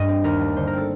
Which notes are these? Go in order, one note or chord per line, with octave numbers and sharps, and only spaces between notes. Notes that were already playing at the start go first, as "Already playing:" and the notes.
Already playing: G2 D#5
C4
D#2 A#4
A3
D3 C5
A#4
C4 A4